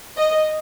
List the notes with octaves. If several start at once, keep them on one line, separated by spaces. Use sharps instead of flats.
D#5